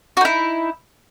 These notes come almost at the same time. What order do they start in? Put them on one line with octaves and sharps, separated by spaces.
F#4 D#4 E4